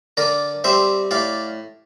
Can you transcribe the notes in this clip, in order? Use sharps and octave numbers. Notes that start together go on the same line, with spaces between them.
D3 A#4 D5
G3 C4 C5 E5
A2 D5 F5